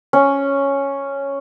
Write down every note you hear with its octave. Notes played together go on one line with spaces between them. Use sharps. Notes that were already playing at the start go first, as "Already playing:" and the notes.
C#4